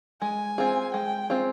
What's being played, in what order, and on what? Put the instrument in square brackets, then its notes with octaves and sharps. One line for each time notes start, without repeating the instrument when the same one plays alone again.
[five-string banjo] G#3 [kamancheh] G#5
[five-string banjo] C4 F4 G#4
[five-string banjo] G#3 [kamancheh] G5
[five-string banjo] C4 F4 G#4